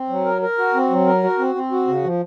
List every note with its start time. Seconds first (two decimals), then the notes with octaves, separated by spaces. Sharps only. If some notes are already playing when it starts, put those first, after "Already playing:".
Already playing: C4
0.09 F#3
0.25 A#4
0.42 A#4
0.58 F#4
0.74 C4
0.90 F#3
1.06 A#4
1.23 F#4
1.39 C4
1.55 C4
1.71 F#4
1.87 C#3
2.04 F3